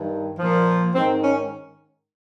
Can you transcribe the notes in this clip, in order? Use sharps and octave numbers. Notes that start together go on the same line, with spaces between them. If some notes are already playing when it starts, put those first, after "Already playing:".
Already playing: G2 D#3
A#2 F3
G#2 D#3 C4
C#4